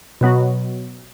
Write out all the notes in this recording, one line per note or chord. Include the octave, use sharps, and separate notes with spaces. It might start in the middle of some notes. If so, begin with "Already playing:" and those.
B2 F#3 B3 F#4